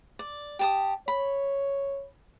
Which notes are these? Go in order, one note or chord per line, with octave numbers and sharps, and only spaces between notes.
D5
G4 A5 D#6
C#5 B5